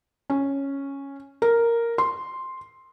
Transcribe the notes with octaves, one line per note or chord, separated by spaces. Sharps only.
C#4
A#4
C6